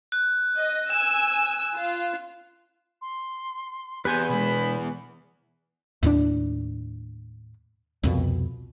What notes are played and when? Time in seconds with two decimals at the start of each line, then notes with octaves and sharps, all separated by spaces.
0.12 F#6
0.59 D#5
0.90 G#5 E6 E7
1.76 F4
3.02 C6
4.05 E2 B3 G4 B4 G#5 C6 G6
4.29 B2 G#3 B5
6.03 D#2 A2 G3 D4
8.03 C2 F2 B2